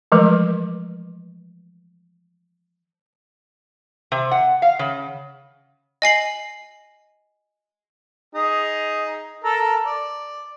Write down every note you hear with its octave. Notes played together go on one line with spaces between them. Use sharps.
E3 F3 G#3 A3 A#4 B4
C3
F#5
F5
C#3
D#5 G#5 C7 F#7
D#4 G#4
A4 A#4
D5